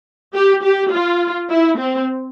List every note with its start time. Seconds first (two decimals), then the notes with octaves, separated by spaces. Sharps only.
0.34 G4
0.63 G4
0.91 F4
1.50 E4
1.78 C4